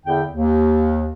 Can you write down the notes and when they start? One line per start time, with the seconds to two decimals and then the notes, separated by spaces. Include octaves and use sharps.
0.06 E2 D3 E4 G5
0.31 D#2